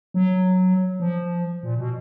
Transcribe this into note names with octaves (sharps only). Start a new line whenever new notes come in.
F#3
F3
A#2
B2